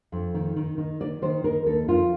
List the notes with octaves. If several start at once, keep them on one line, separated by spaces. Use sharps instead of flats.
F2
D#3
D#3
D#3
D#3 D5
D#3 C5
D#3 A#4
D#2 A4
F2 F4